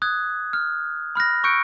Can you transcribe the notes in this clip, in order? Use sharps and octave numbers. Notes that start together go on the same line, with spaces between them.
D#6 F#6 G#6
F6
B5 F6 F#6 A#6
C#6 E6 F#6 G6 C#7 D7